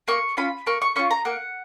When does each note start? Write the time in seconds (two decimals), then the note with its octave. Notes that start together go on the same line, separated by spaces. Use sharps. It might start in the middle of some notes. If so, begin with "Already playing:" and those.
0.08 A#3 C#6
0.37 C#4 F4 B5
0.67 A#3 C#6
0.82 C#6
0.96 C#4 F4 C#6
1.11 A#5
1.25 A#3 F#5